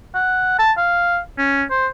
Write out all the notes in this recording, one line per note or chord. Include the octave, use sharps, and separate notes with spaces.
F#5
A5
F5
C#4
C5